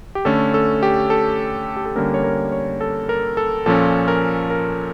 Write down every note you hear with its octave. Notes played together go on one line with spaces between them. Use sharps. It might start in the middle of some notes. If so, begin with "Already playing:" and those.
G4
D3 A3 C#4 A4
A4
G4
A4
G4
A4
D3 G3 A#3 C#4 A#4
C#5
A#4
C#5
A4
A#4
A4
A#2 F3 C#4 A4
A#4
A#4